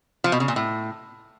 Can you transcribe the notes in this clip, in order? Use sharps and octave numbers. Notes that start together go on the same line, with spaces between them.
F3
B2
C#3
A#2
A2